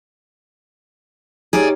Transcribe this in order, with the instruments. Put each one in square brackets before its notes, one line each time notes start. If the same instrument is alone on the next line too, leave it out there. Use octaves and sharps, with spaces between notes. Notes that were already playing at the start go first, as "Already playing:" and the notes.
[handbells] D#4 G4 C#5 [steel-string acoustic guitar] G#4 D5